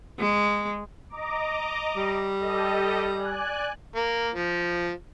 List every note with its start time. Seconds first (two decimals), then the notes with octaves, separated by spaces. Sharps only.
0.19 G#3
1.09 D#5 A#5 D6
1.96 G3
2.38 G4 A4 D#5
3.17 D5 G#5 F#6
3.96 A#3
4.34 F3